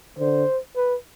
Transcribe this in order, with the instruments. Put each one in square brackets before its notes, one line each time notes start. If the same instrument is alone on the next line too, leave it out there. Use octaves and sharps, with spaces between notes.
[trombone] D3 [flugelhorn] C5
[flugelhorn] B4